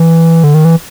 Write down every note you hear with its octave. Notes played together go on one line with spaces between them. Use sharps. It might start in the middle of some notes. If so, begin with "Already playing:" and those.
Already playing: E3
D3
D#3
E3